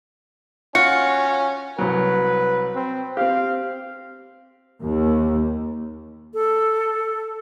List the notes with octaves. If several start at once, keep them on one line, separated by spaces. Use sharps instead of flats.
C#4 F4 F#4 C#7
C2 F#3 B4
C4
C4 G4 F5
D#2
A4